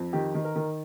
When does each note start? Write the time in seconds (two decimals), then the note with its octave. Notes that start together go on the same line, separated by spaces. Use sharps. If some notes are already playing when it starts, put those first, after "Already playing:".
Already playing: F2
0.13 D#3 G4
0.34 D#3
0.44 A#4
0.55 D#3